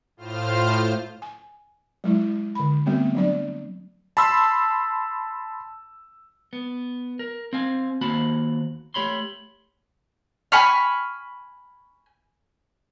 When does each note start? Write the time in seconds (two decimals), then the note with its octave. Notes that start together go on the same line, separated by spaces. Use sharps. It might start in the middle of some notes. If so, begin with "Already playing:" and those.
0.17 A2 F4 C5 F6
1.22 G#5
2.04 F#3 G#3 E4
2.55 D3 B5
2.86 G3 A3 B3 C4 F#4
3.15 F#3 D4 D5
4.17 A5 B5 C6 E6
6.53 B3
7.19 A#4
7.53 C4 F5 G#5
8.01 D#2 A#3 F#4 C5 A5 B5
8.94 A3 G4 C#5 B5 C6
10.52 G#5 B5 C#6 F6